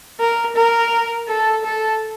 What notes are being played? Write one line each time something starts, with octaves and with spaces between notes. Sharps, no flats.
A#4
A#4
A4
A4